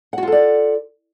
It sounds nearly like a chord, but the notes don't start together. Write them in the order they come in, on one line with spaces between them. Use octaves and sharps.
F#5 F#4 F4 A4 D5